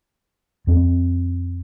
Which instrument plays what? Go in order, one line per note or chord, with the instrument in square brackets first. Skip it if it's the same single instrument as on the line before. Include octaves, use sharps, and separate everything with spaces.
[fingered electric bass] F2 C4